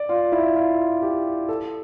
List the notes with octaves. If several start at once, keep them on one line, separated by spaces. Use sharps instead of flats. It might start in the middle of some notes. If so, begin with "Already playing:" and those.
Already playing: D5
F4
E4
F4
G4
A4